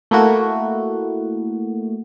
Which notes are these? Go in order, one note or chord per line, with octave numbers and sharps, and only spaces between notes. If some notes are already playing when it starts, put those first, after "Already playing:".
A3 A#3 E4 F#4